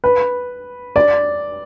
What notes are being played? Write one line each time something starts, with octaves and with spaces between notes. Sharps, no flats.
B4
D5